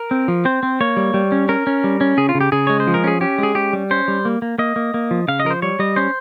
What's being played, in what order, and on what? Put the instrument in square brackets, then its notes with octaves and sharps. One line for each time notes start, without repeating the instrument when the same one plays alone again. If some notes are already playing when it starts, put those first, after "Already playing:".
Already playing: [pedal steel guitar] A#4
C4
F3
C4 C5
C4
A#3 C#5
G3
G3
C#4
C#4 A#4
C#4
G3
C#4
C#3 G#4
F4
C#3
G4
C#3 G#4
G#3 C#5
C5
F3
A#4
C#4 G#4
C#4 G4
G#3 G#4
C#4 G4
G3
C#4 C5
G3
A#3
A#3
A#3 D#5
A#3
A#3
F3
C#3 F5
D#5
F3 A#4
C5
G3 C#5
G3 D#5
C#4 C5